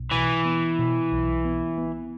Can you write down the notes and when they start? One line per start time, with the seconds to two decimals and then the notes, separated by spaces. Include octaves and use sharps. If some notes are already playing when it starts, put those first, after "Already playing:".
Already playing: B1
0.11 B2 E3
0.45 B3
0.79 B2
1.12 B1
1.45 B3
1.78 B3